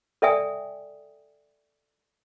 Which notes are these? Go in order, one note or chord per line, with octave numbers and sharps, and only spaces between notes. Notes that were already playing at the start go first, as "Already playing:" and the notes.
A4 D5 E5 G5 G#5 D#6